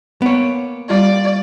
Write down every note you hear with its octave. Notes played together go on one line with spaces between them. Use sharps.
A#3 B3 C#5 D7
G3 F4 D5